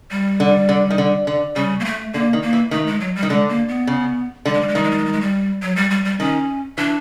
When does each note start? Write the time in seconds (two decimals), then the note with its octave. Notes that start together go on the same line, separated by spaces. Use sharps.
0.11 G3
0.40 D3
0.69 D3
0.90 D#3
0.98 D3
1.27 D3
1.56 C#3 G3
1.80 A#3
1.85 A3
2.13 D3 A#3
2.33 D#3
2.43 A#3
2.53 E3
2.71 D#3 A3
2.87 G#3
3.00 F#3
3.16 G3
3.23 D#3
3.29 D3 G#3
3.49 A#3
3.68 B3
3.87 C#3
4.46 D3 G3
4.54 G#3
4.61 G3
4.68 G#3
4.75 D#3 G3
4.84 G#3
4.91 G3
4.98 G#3
5.05 G3
5.13 G#3
5.21 G3
5.62 F#3
5.76 G3
5.90 G3
6.05 G3
6.20 D#3 C#4
6.78 E3 D4